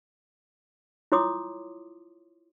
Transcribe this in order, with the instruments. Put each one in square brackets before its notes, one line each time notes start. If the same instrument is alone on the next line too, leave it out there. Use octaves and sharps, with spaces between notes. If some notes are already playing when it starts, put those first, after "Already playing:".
[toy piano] E4 F4 C#5 C6 D6 D#6